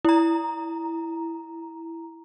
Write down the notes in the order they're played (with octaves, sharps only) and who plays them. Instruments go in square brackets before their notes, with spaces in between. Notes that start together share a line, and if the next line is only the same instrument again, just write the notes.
[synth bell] E4 A#5